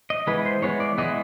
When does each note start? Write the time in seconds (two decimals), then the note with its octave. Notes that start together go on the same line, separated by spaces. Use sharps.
0.10 D#5
0.27 E3 G#3 B3 B4
0.46 C5
0.62 E3 G#3 B3 C#5
0.80 D5
0.98 E3 G#3 B3 D#5